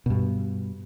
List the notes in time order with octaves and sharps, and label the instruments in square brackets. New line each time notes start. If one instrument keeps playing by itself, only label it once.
[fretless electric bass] G2 B2